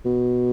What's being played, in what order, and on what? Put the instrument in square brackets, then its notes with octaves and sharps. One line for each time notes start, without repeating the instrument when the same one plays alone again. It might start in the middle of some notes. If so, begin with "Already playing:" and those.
[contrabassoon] B2